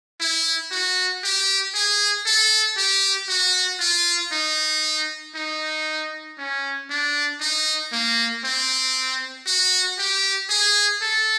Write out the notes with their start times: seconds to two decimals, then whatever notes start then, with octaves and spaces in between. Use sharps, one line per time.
0.20 E4
0.71 F#4
1.24 G4
1.75 G#4
2.26 A4
2.78 G4
3.29 F#4
3.80 F4
4.32 D#4
5.35 D#4
6.38 C#4
6.90 D4
7.41 D#4
7.93 A#3
8.44 C4
9.47 F#4
9.99 G4
10.50 G#4
11.02 A4